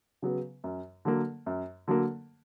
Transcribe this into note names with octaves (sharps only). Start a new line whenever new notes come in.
C#3 F#3 B3
F#2
D3 F#3 A#3
F#2
D3 F#3 A#3